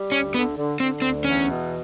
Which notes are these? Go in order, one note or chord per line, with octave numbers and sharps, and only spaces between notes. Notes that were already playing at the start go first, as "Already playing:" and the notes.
Already playing: G3
D2 C#4
D3 B3
D3
D3 C4
D2 C4
E2 C#4
B2